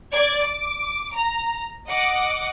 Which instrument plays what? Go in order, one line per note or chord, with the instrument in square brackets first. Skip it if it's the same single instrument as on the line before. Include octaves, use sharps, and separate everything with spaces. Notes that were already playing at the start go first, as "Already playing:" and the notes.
[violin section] D5 G#6
D6
A#5
D#5 F#5 D6